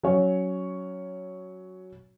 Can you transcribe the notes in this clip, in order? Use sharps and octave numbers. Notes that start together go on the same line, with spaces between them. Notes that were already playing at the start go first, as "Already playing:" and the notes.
F#3 C#4 C#5